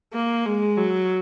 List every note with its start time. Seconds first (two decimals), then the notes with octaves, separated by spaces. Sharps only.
0.14 A#3
0.46 G#3
0.77 F#3